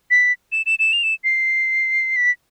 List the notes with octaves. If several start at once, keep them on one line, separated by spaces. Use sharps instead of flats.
B6
E7
E7
E7
F7
E7
C7
B6